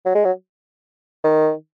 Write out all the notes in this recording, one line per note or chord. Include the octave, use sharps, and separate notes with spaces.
F#3
G#3
F#3
D#3